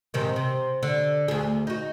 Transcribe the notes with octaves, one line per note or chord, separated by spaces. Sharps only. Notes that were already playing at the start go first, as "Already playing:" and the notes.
G#2 C3 D#3
C3
D3
D2 G#4
D#4 F#4